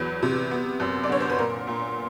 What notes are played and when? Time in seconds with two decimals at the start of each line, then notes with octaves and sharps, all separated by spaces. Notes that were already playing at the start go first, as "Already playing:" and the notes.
Already playing: E2 F#3 B4
0.23 C3
0.51 B3
0.80 F#2
1.03 D5
1.09 D3 C#5
1.20 C5
1.30 B4
1.38 A#2 A#4
1.67 A#2